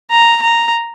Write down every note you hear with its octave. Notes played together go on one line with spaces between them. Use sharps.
A#5
A#5